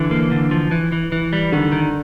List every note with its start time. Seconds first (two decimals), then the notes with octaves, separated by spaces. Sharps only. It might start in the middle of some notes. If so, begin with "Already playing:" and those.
Already playing: D3 E3
0.11 A#3
0.31 D3
0.51 F3
0.71 E3
0.92 E3
1.12 E3
1.33 G3
1.52 D3 D#3
1.72 D#3